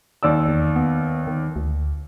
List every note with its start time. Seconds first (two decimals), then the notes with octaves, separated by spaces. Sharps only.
0.23 D#2 D5 E6
0.48 E2
0.76 B3
1.27 D#3
1.56 D2